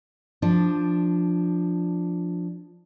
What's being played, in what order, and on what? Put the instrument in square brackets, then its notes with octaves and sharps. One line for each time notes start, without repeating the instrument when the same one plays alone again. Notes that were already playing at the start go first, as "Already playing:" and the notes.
[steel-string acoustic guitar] F3 D4